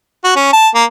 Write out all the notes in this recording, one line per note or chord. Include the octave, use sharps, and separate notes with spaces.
F#4
C#4
A5
A#3